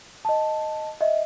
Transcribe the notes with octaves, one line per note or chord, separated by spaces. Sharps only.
D#5 A5
D#5 E5